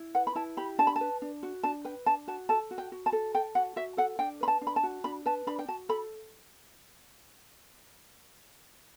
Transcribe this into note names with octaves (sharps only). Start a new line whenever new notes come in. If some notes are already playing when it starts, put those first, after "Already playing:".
Already playing: E4
B4 F#5
B5
E4 A5
G4 B5
D4 A5
B5
A5
B4
D4
F#4
D4 A5
B4 G5
D4 A5
F#4 A5
A4 A5
F#4
G5
F#4
A5
A4
A4 G5
F#4 F#5
F#4 E5
A4 F#5
D4 G5
B4 B5
A5
D4
B5
A5
F#4
D4 B5
B4 A5
D4 B5
G5
F#4 A5
A4 B5